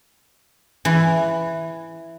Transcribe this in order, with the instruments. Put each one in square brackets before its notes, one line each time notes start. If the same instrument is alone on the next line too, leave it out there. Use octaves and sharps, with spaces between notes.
[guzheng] E3